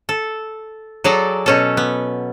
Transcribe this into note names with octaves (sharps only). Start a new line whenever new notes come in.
A4
F#3 G#4 A4 D5 A#5
B2 C#4 A4
B3